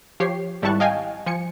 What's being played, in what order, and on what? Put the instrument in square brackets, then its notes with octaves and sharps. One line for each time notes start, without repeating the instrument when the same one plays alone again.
[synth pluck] F3 G4 C#5 C7
G#1 G3 E4 A5 C#6 F#6
D#5 F5 G5 G#5
F3 G#5 C#7